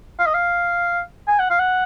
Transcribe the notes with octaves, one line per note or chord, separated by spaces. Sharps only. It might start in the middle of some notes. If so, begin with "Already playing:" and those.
F5
D#5
F5
G#5
F#5
F5
F#5